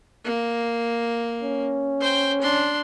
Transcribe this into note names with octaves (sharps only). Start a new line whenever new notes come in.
A#3
C#4
C5 G5
D4 C6